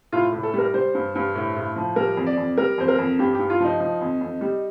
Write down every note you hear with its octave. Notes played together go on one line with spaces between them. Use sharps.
A2 F4
A2
A4
G3 A#4
G3 C5
G2
G2
A2
A2
F3
G3 A#4
F2
D5
F2
G3 A#4
F2 C5
A#4
F2
G2 G4
G2 G4
F4
F3 D#4
F3
F2
F2
G3